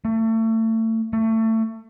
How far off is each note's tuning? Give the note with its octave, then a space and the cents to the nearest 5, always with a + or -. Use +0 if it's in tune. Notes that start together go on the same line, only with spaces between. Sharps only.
A3 +30
A3 +25